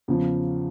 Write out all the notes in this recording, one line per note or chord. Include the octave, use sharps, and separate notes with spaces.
E2 C#3 F3